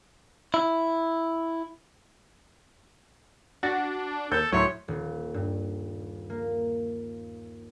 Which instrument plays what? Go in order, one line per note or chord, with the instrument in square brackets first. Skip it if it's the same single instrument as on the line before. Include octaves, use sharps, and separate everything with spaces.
[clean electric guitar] E4
[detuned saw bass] D4 [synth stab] F#4 [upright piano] A6
[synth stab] D#2 [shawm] A4 [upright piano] G6
[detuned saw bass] D2 [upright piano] A2 E5 C6 [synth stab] F#3 [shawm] C#5
[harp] D#1
G2
A#3